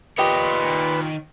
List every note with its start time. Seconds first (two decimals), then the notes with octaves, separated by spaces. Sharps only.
0.18 A#2 D#3 G4 B4 C#5 D#5